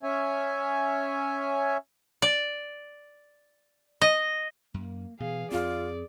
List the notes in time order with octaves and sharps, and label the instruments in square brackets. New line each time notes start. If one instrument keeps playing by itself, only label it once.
[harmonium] C#4 C#5 E5 G#5
[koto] D5
D#5
[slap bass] F#2 [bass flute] A#3
[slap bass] B2 [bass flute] E3 [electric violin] G#4 F5
[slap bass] F2 C4 [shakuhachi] F4 [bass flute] G#4 [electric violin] D5